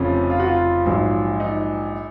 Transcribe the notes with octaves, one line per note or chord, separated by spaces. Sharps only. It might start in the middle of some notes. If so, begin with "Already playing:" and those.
Already playing: F1 F2 C#3 F3 C#4
F4
F#4
F4
A#1 G#2 F#3
D#4